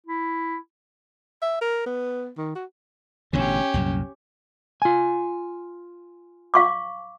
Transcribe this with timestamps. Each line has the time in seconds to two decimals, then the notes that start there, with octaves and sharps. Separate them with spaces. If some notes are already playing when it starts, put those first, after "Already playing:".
0.06 E4
1.42 E5
1.62 A#4
1.86 B3
2.38 D#3
2.55 F#4
3.33 A1 B2 D3 C#4 G4
3.74 C2 F#2 A#2
4.82 F4 G#5
6.54 F5 C#6 D6